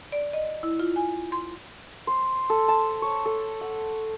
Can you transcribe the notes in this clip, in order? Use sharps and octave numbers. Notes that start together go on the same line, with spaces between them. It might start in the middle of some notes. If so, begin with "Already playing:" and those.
D5
D#5
E4
F4
G#5
C6
C5
A4
A5
C#5
A4
F#5